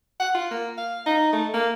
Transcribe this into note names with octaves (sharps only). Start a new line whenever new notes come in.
F#5
F4
A#3
F5
D#4
A3
A#3